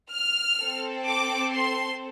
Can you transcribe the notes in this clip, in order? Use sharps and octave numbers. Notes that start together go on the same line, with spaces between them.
F6
C4 A4
D6
C6